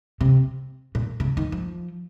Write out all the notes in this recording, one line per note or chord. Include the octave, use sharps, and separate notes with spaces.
C3
A#2
C#3
D#3
F3